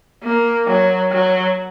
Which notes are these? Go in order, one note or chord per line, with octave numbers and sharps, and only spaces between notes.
A#3
F#3
F#3